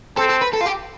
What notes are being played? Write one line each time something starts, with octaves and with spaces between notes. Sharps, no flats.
C4 A4
A4
B4
A4
F4
G4